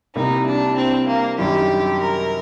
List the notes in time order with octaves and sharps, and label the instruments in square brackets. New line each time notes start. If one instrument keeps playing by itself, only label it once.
[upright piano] C2 C3 G3 A#3 [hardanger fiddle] D#4
[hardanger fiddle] D4
C4
A#3
[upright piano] F#2 D#3 G3 D4 [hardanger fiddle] G4
[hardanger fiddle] A#4